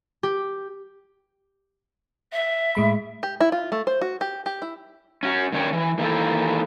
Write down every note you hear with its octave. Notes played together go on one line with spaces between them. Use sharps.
G4
E5
A2 G#3 B5
G4
E4
F4
A3
C5
F#4
G4
G4
E4
C#4 F#4
G2 D#3 C#4 C#5 G5
E3
D#3 E3 A#3 E4 A4 C5